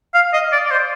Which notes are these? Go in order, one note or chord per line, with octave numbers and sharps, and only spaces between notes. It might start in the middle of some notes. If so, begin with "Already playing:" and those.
F5
D#5
D5
D5
C5